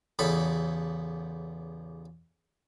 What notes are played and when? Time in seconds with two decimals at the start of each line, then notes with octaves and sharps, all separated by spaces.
0.19 A1 E2 C#3 A4 B5